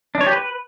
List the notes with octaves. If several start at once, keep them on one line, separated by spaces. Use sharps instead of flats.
D4
C#5
G4
B4